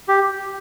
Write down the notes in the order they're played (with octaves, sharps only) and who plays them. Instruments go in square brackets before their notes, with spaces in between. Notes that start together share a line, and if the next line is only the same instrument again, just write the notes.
[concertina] G4